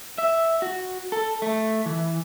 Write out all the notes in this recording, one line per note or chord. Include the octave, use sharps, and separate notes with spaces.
E5
F#4
A4
A3
E3